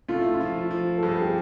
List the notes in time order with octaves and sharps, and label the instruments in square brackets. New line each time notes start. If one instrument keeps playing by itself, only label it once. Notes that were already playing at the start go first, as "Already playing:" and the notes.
[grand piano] A3 [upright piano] F4
[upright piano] E4
F4
[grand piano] F3
F3
[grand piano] G2 [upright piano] A4
[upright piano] G#4
G4